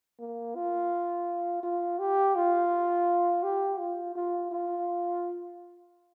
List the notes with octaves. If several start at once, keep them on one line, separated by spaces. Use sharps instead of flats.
A#3
F4
F4
G4
F4
G4
F4
F4
F4